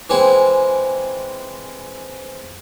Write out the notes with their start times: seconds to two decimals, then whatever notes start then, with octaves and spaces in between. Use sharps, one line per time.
0.10 E3 G#3 C4